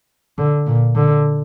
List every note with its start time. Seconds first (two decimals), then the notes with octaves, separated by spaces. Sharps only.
0.38 D3
0.67 A#2
0.95 D3